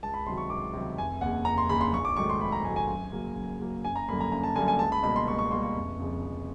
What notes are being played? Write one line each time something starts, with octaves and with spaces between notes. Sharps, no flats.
C#2 A5
B5
C3 D#3 F#3 C6
C#6
C#2 D6
C3 D#3 F#3
F1 G#5
D#2 C#3 F#5
F1 A#5
C6
D#2 C#3 B5
C6
A#1 C#6
D6
G#2 D#3 F#3 A3 C#6
C6
A#1 B5
A#5
G#2 D#3 F#3 A3 G#5
G#5
F#2
C#3 F#3 A#3
F#2
C#3 F#3 A#3
F#1 G#5
A#5
F#2 D3 G3 A#3 B5
A#5
F#1 A#5
A5
F#2 D3 G3 A#3 G#5
G#5
C#2 A5
B5
B2 G3 A#3 B5
C6
C#2 C#6
C#6
B2 G3 A#3 C6
C#6
F1
F2 C#3
F1